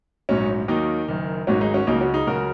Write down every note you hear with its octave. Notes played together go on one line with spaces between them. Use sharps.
A#1 G#2 F#3 C#4
D#2 D#3 F#3 A#3 D#4
F#1 F#2 D#3
G#1 G#2 F#3 C#4 F#4
D#4 G#4
C#4 F#4
C#2 C#3 F#3 A#3 D#4
C#4 F#4
D#4 G#4
C#2 C#3 F#3 F#4 A#4